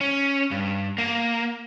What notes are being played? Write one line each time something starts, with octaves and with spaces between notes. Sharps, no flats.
C#4
G2
A#3